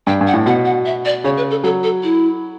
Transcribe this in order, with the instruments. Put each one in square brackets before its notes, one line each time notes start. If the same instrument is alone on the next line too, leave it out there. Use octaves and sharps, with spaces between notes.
[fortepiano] G2 [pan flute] G5
[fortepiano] G2
[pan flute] F#5
[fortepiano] A2
[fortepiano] B2 [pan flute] F#5
[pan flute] F#5
E5
D5
[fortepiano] C#3 [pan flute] C#5
[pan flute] B4
A4
[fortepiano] F#3 [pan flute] A4
[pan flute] A4
E4